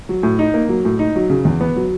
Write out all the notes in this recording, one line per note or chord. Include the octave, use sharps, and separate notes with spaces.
F#3
A2
D#4
A#3
F#3
A2
D#4
F#3
C#3
E2
B3
F#3